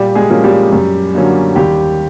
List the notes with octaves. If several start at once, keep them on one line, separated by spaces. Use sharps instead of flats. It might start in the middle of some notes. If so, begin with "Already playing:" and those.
Already playing: A#2 G3 G4
G#3 G#4
F3 A#3 C#4
G3 G4
F#2
D3 F#3 A#3 C#4
D#2 G3 G4